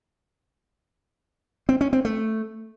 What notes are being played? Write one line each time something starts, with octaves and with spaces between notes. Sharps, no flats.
C4
C#4
C4
A3